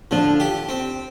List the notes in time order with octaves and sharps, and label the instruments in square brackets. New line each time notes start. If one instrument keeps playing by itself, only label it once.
[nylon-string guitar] D3 [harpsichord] F3
[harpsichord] G4
C4